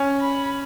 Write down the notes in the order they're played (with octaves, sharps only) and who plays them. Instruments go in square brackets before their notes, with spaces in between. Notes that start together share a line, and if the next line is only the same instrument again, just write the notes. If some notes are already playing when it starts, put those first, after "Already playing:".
Already playing: [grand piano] C#4
[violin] B5